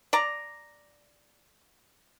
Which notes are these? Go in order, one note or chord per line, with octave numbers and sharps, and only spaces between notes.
D5 A#5